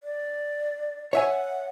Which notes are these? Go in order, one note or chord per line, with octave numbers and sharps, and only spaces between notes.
D5
C#5 E5 F#5 G#5